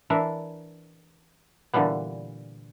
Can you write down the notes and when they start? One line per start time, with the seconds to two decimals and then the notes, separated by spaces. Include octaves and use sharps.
0.10 E3 D4 A#4 E5
1.73 A#2 D3 E3 G3 B3